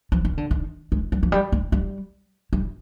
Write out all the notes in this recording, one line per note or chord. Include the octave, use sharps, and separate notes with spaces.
F3
D#3
D3
D#3
G#3
G3
F3
G3
G#3
G3
G3